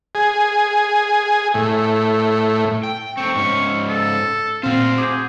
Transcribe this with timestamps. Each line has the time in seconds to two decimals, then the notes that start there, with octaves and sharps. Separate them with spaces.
0.15 G#4
1.54 A2
2.83 G5
3.17 A3 C4 C#6
3.35 G#2 C#4
3.89 A4
4.63 A#2 C4 F#4 C5 F5
4.98 G#4 D6 G6